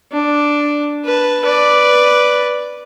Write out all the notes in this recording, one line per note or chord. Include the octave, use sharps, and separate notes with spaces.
D4
B4 A5
B4 D5